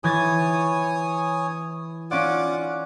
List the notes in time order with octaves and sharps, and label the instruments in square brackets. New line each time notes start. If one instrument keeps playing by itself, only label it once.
[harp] E3 G#6 A6 [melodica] C#5 G#5 D#6
[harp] C#4 D5 [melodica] F4 F#5 D6